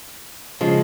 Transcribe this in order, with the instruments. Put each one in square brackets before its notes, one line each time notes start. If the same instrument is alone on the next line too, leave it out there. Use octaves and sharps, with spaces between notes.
[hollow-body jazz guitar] C#3 F3 G#3